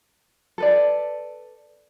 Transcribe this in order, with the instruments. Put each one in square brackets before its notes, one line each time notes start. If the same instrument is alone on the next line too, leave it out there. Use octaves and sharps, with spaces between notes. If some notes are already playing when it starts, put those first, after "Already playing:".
[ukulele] A4 B4 D5